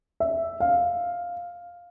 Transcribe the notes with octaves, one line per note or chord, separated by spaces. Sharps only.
E5
F5